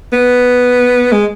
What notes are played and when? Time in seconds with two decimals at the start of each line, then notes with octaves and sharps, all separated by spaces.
0.13 B3
1.12 G#3